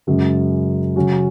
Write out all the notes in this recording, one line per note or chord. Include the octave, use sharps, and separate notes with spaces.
F#2 C#3 G#3
C#3 F#3 C#4 F#4